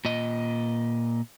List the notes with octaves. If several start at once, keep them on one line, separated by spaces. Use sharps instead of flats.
A#2 D#5